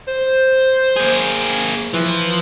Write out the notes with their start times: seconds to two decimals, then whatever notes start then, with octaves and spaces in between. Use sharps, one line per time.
0.08 C5
0.96 A#3 G#4
1.93 E3 F3